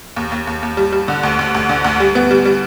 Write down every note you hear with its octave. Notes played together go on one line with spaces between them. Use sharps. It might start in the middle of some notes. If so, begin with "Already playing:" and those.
D#2
D#2
D#2
D#2
G3
G3
D3
D2
D2
D2
D3
D2
G3
B3
G3
G3